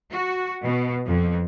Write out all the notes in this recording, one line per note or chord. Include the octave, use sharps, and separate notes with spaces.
F#4
B2
F2